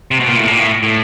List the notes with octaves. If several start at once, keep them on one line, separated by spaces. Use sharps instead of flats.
C3
B2
A#2
A2
A#2
A2
A2